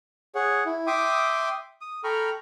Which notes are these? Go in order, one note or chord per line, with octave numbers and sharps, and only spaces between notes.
G#4 C#5 F#5
E4
E5 G5 C6 D6 D#6
D#6
A4 G5 A#5 B5 C#6 F6